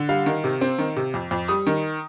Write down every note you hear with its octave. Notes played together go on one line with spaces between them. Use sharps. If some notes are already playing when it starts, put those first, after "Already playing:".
Already playing: D3
G3 F5
D#3
C3
C4
D#3
C3
F2
F2
G3 D#6
D#3